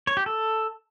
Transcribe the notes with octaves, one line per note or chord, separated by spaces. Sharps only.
C#5
G4
A4